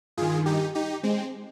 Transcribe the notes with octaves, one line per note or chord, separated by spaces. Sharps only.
G2 D#3 F4 G#4
D#4 G4
D#4 G4
G#3 C4